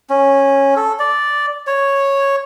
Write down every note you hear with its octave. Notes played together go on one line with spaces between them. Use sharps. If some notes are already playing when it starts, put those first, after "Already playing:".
C#4
A4
D5
C#5